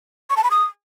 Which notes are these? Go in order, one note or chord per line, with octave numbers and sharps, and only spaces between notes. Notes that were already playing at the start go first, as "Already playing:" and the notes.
C#6
A5
B5
D#6